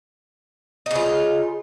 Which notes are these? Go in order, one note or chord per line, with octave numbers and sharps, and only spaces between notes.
C#3 D#4 F4